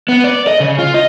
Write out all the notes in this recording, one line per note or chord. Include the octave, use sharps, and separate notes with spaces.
B3
D5
D#5
C#3
F4
D#5